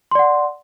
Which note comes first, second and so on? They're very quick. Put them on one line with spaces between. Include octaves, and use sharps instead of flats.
C6 D5 F#5